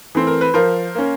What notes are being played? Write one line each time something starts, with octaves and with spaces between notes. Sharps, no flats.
E3 A3 C4
A#4
B4
F3 A#4 C5
A#3 C#4